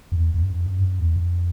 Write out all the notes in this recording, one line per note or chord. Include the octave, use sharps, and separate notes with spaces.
F2
E2
E2
F#2
F2
F#2
G2
F#2
E2
F2